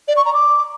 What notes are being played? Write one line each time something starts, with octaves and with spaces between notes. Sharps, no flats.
D5
C#6
A#5
D6